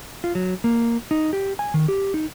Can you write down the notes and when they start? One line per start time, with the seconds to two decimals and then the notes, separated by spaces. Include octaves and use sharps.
0.24 F4
0.35 F#3
0.64 A#3
1.11 D#4
1.33 G4
1.59 G#5
1.74 D#3
1.88 G4
2.14 D#4